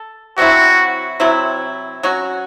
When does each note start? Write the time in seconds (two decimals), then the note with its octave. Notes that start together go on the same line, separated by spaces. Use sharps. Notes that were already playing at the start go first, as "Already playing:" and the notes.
Already playing: A4
0.37 C3 F#3 C4 E4 F#4
1.20 C3 F#3 C4 E4
2.03 F#3 C#4 F#4